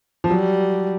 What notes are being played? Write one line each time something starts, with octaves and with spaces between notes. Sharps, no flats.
F3
F#3 G3